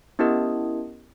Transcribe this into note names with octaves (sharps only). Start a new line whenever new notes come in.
B3 C#4 E4 G4 A#4 D#5